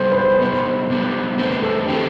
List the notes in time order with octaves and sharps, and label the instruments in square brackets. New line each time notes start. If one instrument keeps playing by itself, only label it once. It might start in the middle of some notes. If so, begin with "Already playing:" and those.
Already playing: [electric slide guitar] C3 G3 B3 [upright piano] A4 C5
[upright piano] B4
C5
[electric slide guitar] C3 G3 B3 [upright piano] C5
[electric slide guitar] C3 G3 B3
[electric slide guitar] E2 D3 A3 C4 [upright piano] B4
[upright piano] A4
[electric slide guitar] D3 A3 C4 [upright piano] G4